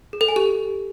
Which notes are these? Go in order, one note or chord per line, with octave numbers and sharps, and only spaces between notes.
G#4
A4
G#5
G4